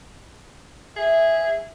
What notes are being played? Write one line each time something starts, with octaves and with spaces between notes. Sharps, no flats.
G#4 E5